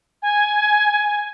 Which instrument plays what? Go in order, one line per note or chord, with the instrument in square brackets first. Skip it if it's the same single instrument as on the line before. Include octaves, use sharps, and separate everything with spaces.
[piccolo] G#5